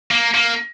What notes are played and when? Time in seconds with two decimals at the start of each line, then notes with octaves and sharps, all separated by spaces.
0.11 A#3
0.34 A#3